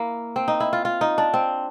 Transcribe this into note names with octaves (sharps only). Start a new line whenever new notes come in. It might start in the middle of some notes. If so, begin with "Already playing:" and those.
Already playing: A#3 E4
C4
D#4
E4
F4
F4
D#4
D4
C4